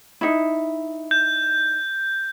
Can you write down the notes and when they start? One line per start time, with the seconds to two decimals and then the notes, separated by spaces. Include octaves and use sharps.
0.21 D#4 E4
1.11 G6